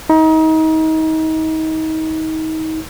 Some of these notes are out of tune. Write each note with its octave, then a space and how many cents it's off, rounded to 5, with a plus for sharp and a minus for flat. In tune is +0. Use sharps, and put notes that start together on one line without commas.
D#4 +30